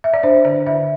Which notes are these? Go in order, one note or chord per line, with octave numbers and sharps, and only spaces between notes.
E5
D5
D4 C5
D3 D5
D3 E5